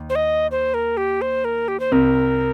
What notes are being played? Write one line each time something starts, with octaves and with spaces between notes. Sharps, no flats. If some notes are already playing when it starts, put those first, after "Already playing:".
Already playing: D#2
C5
D#5
C5
A#4
G4
C5
A#4
G4
C5
C2 C3 A#4